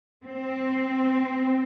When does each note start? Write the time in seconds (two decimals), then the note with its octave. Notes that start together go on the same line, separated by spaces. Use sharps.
0.25 C4